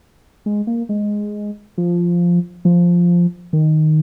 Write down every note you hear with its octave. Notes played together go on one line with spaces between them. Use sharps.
G#3
A#3
G#3
F3
F3
D#3